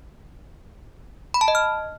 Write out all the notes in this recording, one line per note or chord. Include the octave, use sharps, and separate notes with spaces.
B5
A5
D#5
F6